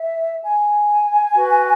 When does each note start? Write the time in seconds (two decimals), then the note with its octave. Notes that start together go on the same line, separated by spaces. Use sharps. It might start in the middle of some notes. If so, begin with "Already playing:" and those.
Already playing: E5
0.43 G#5
1.35 F#4 B4